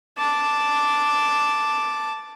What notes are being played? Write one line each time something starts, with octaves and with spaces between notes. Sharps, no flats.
A5 D6